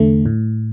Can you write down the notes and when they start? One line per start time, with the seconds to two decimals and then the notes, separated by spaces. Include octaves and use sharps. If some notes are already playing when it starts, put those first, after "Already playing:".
Already playing: E2 D3 A3
0.26 A2